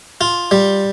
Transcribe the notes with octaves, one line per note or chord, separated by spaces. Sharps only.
F4
G3